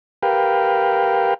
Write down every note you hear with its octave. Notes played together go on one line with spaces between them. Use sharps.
G4 A#4 B4 F5 G5